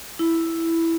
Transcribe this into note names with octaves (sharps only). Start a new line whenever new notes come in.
E4